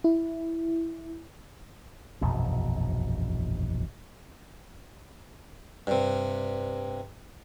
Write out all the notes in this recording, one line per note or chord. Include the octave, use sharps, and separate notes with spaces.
E4
E1 A#1 F#2 B2
G2 C3